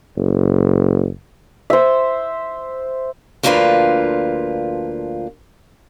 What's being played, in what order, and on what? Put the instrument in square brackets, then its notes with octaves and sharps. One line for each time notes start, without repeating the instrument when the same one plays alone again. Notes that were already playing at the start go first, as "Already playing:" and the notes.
[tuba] F#1
[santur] C5 E5
[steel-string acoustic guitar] D2 F3 A#3 D4 F4 B4